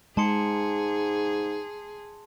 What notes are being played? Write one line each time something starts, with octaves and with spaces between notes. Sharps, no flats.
G#2 G#3 G#4 A5 C6 C#7